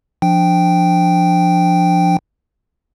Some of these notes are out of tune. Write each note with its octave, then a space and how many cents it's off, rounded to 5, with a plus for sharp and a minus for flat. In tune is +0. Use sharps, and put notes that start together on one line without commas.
F3 +0 D4 +0 G5 +0